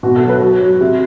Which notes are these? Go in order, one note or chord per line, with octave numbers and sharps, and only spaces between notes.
B2 F#4
A4
F#3
B4
F#3
F#3
C3